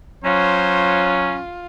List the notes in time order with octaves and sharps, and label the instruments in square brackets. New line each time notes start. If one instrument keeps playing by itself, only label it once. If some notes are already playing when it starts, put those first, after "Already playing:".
[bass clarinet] F#3 [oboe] C#4 [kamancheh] F4 [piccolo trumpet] C5